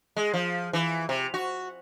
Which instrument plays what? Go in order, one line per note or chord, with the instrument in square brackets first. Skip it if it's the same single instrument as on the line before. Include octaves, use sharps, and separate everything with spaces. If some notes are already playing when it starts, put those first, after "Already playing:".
[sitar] G#3
F3
E3
C3
F#4